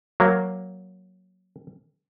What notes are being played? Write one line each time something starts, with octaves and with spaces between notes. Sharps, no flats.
F#3 A#3